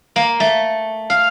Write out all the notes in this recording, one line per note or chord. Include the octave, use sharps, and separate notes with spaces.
A#3
A3
F5